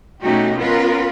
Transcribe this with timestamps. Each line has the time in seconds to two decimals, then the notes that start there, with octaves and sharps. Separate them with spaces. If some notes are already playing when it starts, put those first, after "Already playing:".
0.21 B2 A3 C#4 D#4 F#4 G4
0.57 B3 C#4 F4 A#4 B4